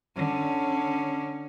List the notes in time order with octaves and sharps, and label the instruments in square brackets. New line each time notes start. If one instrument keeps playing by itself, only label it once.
[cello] D3 C#4